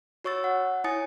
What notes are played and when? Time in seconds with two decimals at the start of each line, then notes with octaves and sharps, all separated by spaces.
0.24 F#4 C#5 C#6 E6 A6
0.44 F#5
0.84 E4 C#5 G#5 D#6 A6 C#7